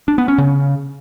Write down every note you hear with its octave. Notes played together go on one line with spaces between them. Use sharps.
D4
B3
C#4
C#3